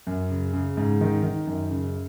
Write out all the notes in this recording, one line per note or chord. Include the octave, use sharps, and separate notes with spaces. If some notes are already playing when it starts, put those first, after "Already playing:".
F#2
C#3
C#3
G#2
D#3
D#3
F#2
C#3